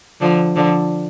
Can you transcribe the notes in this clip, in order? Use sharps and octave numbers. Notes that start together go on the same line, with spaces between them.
D3 F3
D3 F3